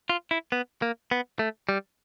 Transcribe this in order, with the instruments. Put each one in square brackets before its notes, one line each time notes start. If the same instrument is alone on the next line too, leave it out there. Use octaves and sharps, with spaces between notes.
[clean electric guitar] F4
E4
B3
A#3
B3
A3
G3